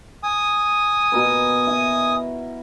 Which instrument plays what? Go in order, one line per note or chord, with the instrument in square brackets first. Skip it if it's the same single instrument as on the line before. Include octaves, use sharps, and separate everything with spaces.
[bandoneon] G#5 D#6
[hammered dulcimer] B2 A#4 B4
E4